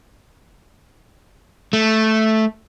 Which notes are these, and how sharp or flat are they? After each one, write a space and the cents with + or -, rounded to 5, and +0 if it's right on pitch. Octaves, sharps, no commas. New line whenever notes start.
A3 -5